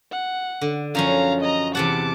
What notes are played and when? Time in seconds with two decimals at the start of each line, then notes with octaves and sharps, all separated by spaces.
0.11 F#5
0.61 D3
0.95 F#2 F3 C#4 F5 A#5
1.41 D#5 A#5
1.75 E2 C3 F#5 A5 D6